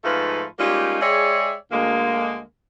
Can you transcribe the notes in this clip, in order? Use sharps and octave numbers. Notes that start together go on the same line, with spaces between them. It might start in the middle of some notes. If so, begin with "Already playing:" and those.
G#2 F3 A3 F4 B4
G3 G#3 A#3 C#4 D#4 F4
G#3 G4 G#4 C#5 D5 E5
D2 G#3 A#3